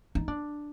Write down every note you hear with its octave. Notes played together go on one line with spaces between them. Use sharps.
D#4
D4